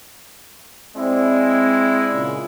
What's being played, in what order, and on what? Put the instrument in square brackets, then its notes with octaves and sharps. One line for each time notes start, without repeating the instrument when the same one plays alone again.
[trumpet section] G#3 E4 [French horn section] C4 D5
[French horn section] A#2 C#3